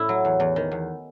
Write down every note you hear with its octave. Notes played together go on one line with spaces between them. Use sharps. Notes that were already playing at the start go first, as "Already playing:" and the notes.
Already playing: A2 E4
F#3
E2
E2
D#3
E2